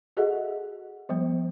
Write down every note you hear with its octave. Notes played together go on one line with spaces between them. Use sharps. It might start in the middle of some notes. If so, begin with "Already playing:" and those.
F#4 G#4 A4 D#5 E5 F#5
F3 G3 B3 C5